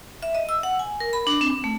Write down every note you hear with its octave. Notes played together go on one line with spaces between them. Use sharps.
E5
D#5
E6
F#5
G#5
A#4
B5
D4
C4
A3